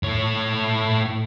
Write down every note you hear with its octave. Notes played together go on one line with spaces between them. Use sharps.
A2 C#5